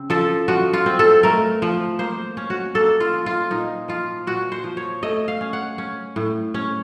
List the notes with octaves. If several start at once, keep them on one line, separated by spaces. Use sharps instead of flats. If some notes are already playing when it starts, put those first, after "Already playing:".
Already playing: C#3 C4
F3 A4
F3 F#4
F4
C4
A4
A3 A#4
F3
A#3 C5
C#4
F#4
A#3 A4
F4
F3
F4
A#2 D#4
F3 F4
A#2 F#4
C5
F3
C#5
A3 D#5
F5
C#4
F#5
C#4
A2
C#4